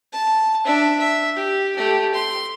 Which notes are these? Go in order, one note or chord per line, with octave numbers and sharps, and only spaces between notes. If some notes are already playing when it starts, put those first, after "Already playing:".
A5
D4 E5
E5
G4
A3 G4
C6